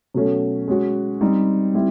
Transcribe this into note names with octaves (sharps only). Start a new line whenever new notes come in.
B2 F#3 A3 C#4
G#3 C#4 F#4
G3 C4 D#4
G3 C4 E4 G4